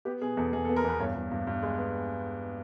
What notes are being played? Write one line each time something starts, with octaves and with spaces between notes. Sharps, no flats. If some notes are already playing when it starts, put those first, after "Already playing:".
B3 G4
B2 G#4
E2 A4
E2 G#4
A4
B3
A#4
E2 B4
G2 C#5
G2
G2
G2
G#3
B3